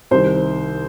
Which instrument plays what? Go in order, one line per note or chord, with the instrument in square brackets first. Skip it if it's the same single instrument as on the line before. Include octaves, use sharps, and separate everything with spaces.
[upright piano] C2 C3 D#3 C5